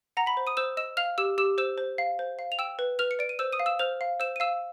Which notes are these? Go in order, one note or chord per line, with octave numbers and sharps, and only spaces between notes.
F#5 A#5 A#6
B5 B6
C5
D#6 D#7
C5 E6 E7
D#5 E6 E7
F5 F6 F7
G4 E6 E7
G4 E6 E7
C5 E6 E7
C5
F5
C5
F5
F7
G5 E6 E7
B4
B4 F6 F7
C#7
D5 D7
D#7
C5 E6 E7
D#6 D#7
F5
E6 E7
C5 F6 F7
F5
C5 E6 E7
D#7
F5 E6 E7